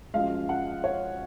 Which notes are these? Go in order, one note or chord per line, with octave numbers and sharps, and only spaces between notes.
F#2 F3 G#3 F5
F#5
C#5